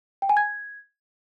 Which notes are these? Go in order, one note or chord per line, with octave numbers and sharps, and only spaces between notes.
G5
G#5
G#6